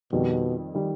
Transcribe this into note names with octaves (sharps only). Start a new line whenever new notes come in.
F2 B2 D#3 G3
D#3 G3